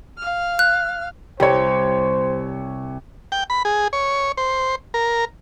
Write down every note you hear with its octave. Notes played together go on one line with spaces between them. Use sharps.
F5 F6
F#6
C2 G4 C5 C#5
G5
B5
G#4
C#5
C5
A#4